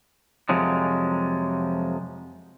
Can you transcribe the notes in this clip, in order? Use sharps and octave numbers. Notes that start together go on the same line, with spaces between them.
F2 C3 F3 F#3 G#3